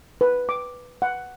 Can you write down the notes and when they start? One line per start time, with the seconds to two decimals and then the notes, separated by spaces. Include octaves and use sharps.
0.21 B4
0.49 D6
1.02 F#5